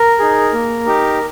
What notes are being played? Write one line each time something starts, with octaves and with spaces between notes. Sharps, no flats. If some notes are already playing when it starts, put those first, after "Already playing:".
Already playing: A#4
D#4 G#4
A#3
D#4 G4